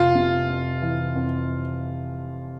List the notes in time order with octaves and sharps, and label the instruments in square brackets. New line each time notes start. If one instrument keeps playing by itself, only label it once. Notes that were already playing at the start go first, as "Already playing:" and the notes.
Already playing: [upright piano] F1 [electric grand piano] F4
[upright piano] C3
F2
E3
F2